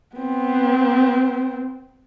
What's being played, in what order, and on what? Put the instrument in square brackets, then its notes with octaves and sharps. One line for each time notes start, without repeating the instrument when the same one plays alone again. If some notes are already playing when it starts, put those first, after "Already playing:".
[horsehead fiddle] B3 C4